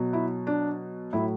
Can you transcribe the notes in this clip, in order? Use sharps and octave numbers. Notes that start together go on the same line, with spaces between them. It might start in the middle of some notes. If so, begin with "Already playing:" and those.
Already playing: B2 F#3
E4
D4
A2 F#3 E4